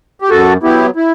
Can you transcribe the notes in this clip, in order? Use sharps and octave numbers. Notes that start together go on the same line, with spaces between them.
G4
F#2 F#4 A4
F#3 B3 E4 G4
E4